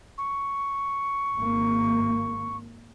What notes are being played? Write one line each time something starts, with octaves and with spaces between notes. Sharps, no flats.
C#6
G#1 A#3